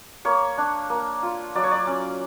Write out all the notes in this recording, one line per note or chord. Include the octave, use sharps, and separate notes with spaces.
A#3 C#5
D4
A#3
F4
F#3 D5
C#5
D5
C#4